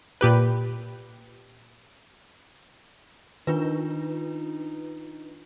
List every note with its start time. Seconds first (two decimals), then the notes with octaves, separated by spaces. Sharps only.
0.21 A#2 G4 B4
3.47 D#3 D4 D#4 F4 B4